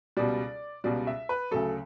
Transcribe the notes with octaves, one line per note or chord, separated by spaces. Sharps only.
C#2 B2 G3 D5
C#2 B2 G3 D5
E5
B4
D2 C#3 F#3 A4